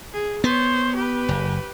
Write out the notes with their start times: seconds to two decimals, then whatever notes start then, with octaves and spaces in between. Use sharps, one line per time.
0.13 G#4
0.44 B3 C5 C#5
0.95 G4 B4
1.28 F#1